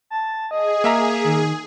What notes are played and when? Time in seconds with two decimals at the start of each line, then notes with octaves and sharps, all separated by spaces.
0.10 A5
0.51 G#4 D#5
0.84 A#3 E5 A#5
1.24 D#3